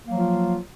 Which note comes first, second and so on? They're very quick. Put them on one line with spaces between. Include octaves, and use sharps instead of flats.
A#3 F#3 F3 F4